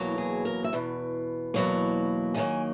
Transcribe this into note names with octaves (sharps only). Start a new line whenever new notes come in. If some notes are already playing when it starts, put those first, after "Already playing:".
Already playing: E2 B2 F#3 A#3
G#4
A#4
E5
E2 B2
E2 B2 F#3 A#3
D#2 D#3 F#3 A#3 G#5